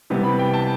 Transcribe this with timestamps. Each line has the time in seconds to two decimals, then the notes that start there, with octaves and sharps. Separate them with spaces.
0.10 C3 E3 G3 B3
0.24 B5
0.39 G5
0.53 A5